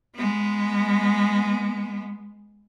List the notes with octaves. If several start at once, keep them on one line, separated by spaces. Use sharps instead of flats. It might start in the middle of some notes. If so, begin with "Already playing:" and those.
G#3 B3